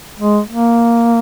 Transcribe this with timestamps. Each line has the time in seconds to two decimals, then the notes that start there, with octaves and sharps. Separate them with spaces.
0.19 G#3
0.49 A#3